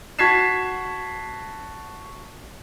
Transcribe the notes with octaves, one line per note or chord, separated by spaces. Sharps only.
F#4 A5 G#6 B6 C7 E7